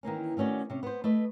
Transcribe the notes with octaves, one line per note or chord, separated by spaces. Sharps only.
D#3 E3 A#3 C#4
D#3 A3 C#4 F#4 D5
C3 C#4
B3 C5
A3 B4 D#5